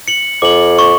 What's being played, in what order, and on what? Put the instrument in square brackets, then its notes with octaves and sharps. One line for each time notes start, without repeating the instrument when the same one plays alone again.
[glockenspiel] C#7 F#7
[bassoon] F2 [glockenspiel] D6 F#7
[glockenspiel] C#6